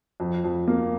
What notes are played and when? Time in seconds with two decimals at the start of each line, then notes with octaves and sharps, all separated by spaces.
0.20 F2
0.44 F2
0.68 A#3